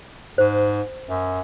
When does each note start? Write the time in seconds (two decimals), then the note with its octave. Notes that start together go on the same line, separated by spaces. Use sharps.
0.38 G#2 C5
1.09 F#2